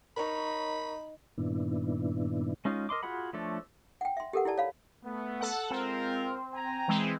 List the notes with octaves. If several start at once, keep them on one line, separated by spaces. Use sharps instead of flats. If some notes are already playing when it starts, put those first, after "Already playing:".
D#4 A#4 C#5 B5
G2 A#2 D#3 B3 D4 E4
G#3 C#4 D#4 F4
A#4 D#5 C6 D6
F4 F#4 G#4 F#5 B5
F3 A3 D4 A4 C#5
F#5 G5
E5 C6
G4 A4 A#4 F#5
E4 G4 D5 A5
C#5 F5 B5
A3 B3
A4 F#5
G#3 C4 F4 A#4
G5 G#5 A#5
E3 G#3 C4